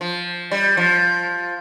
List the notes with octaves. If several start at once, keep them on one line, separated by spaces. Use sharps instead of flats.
F3
G3
F3